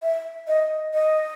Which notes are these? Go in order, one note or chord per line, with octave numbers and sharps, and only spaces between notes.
E5
D#5
D#5